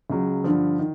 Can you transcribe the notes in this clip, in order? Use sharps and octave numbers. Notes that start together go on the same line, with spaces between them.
C#2 C#3 F#3
G2 D3 F3
D#3